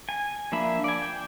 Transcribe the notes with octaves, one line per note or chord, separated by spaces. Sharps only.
G#5
F3 A#3 D4 E5 B5
D5 G#5
G5